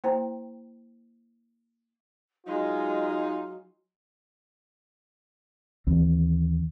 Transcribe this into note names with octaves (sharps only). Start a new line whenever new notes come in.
A#3 E4 C5 G5 A#5
F#3 G#3 D#4 F4
D#2 E3 C4